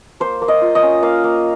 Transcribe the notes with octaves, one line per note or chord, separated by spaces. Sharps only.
A#3 C5
A#3
D#5
F4
D#5
C#4
A#3 F5
A#3